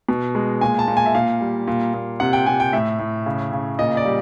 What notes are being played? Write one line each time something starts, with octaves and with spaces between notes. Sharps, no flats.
B2
G#3
A#2 G#5
A5
A#2
G#5
E5
A#2 F5
G3
A#2
A#2
C3 F#5
G5
C3 G#5
G5
A2 E5
A2
C#3
C#3
A#2 D#5
D5
G3